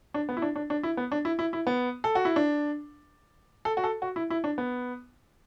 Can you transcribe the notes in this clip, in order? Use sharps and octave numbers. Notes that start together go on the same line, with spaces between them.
D4
B3
E4
D4
D4
D4
E4
B3
D4
E4
E4
E4
B3
A4
F#4
E4
D4
A4
F#4
A4
F#4
E4
E4
D4
B3